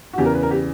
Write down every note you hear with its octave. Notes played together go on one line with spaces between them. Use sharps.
F#4
E2 C#3 E3 G4
A#4
B4
A#4
G4